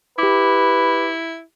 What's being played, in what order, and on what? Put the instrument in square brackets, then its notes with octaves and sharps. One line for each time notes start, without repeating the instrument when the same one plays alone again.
[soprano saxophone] E4 [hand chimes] G4 D6 [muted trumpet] B4